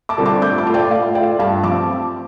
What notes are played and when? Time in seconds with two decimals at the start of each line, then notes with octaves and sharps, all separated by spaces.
0.09 A5 D6
0.18 D3 G3 C4 F4
0.25 A5 D6
0.42 A2 D6 G6
0.58 A5 D6
0.67 A3 F4
0.74 D5 G5
0.90 A2 F5
1.15 A3 F4 D5 G5
1.39 G2 F5 A5
1.64 F3 A5 D6
1.68 C4